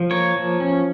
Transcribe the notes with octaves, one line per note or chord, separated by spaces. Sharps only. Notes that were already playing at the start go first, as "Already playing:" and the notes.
Already playing: F3
A#3 C#5
F3
C#4